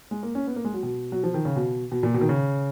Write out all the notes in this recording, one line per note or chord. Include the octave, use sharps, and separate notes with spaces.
G#3
A#3
C#4
B3
A#3
G#3
F#3
B2
F#3
F3
D#3
C#3
B2
B2
A#2
B2
D#3
C#3